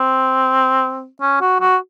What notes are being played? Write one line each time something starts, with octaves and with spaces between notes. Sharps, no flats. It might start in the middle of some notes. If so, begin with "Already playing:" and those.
Already playing: C4
C#4
F#4
F#4